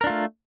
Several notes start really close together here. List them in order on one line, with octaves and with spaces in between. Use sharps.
A#4 D4 F4 A3